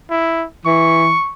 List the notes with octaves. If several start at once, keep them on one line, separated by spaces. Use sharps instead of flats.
E4
E3 C#6